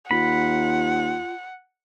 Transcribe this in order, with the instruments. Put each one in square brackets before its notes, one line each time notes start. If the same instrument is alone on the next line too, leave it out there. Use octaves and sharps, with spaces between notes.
[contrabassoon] D#2 [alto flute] F4 [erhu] F#5 [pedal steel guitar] B5